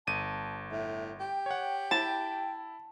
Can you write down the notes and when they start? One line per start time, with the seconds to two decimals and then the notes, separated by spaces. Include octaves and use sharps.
0.07 G1 A5 D#7
0.71 A2 E5
1.20 G4 G5
1.46 C#5 F#5 G5
1.91 E4 G5 A5